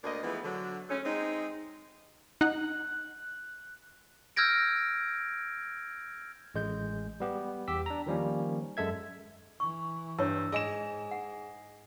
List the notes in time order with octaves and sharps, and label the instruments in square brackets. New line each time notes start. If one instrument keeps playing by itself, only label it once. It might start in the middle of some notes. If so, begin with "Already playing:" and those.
[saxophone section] D2 A#3 D4 D#5
E3 F3 G#3 A3 B3
D3 F#3
G#3 A3 C#4
G#3 C4 D#4
[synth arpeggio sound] D#4 F#5 [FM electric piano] F#6
[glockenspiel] E6 F6 G6 G#6 A#6 D7
[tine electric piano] A1 G#3 G6
G3 B3 G4
E2 G4 E6 B6
D4 A#5
D#3 F3 G3 A#3 C#4
F#2 G#3 A4 E5 G#6
[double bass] E3 [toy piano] C#6
[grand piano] G2 [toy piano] E4 C#5 [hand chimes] E6
[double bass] G#2 [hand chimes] G#4 G#5 [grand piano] D#5 E7
[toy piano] F#5